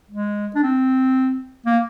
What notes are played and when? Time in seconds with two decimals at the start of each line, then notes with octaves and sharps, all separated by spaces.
0.11 G#3
0.55 D4
0.63 C4
1.66 A#3